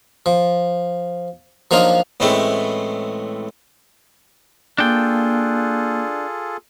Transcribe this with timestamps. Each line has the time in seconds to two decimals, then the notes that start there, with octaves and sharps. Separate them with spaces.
0.26 F3
1.71 F3 F#3 A#3 D4 D#4 F4
2.20 A2 E3 G#3 A3 C4 C#4
4.78 A#3 D4 F4 G#4 A4 G5